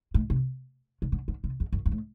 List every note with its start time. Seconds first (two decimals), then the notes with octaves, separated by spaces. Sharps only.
0.14 A2
0.30 C3
1.02 C3
1.12 D3
1.28 D3
1.44 C3
1.60 E2
1.73 F#2
1.86 G2
1.92 A2